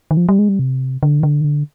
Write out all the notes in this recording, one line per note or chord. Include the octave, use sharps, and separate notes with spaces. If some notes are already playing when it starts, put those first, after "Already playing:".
D#3
F3
G3
G#3
G3
C3
D3
D#3
D3
D#3
D3